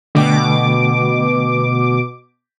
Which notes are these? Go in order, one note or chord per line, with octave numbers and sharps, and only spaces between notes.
B2 D3 A3 G5 D6